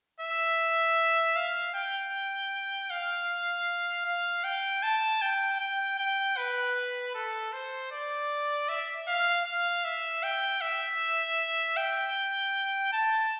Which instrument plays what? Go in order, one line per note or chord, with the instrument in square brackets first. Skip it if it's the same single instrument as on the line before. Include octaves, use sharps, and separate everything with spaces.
[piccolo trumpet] E5
F5
G5
F5
F5
G5
A5
G5
G5
G5
B4
A4
C5
D5
E5
F5
F5
E5
G5
E5
G5
A5